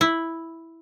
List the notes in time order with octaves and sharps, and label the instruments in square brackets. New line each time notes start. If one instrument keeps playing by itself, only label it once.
[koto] E4